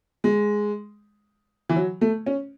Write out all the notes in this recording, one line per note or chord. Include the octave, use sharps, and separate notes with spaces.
G#3
E3
F#3
A3
C#4